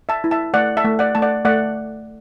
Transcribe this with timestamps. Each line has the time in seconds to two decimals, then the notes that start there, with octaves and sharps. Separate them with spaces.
0.09 E5 A5
0.24 E4
0.31 E5 A5
0.54 A3 D5 F#5
0.77 E5 A5
0.85 A3
0.99 D5 F#5
1.15 A3 A5
1.22 D5 F#5
1.45 A3 D5 F#5